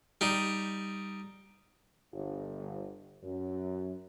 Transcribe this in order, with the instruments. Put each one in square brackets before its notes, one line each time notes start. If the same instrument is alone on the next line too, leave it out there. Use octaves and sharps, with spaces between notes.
[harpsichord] G3 D#4
[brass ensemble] G1
F#2